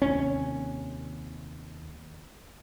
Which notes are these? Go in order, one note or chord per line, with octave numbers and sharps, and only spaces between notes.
D#2 C3 C#4